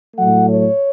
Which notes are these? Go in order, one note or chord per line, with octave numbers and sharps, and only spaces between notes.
A2 F#3 A3 F#5
C#5